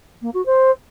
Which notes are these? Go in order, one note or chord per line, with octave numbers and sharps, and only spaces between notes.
A#3
F#4
C5